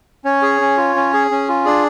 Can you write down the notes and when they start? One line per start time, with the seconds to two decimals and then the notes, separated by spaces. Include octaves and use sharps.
0.25 C#4 C#5
0.42 G#4
0.61 C#4
0.77 F4
0.96 C#4
1.13 G#4
1.31 C#4
1.48 F4
1.65 D4 G#4 D5